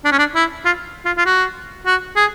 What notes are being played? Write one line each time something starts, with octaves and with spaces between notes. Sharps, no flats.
D4
C#4
D4
E4
F4
F4
F4
F#4
F#4
G#4